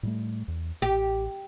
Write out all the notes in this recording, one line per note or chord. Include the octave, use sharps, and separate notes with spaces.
A2 G3 A3
E2
A1 G4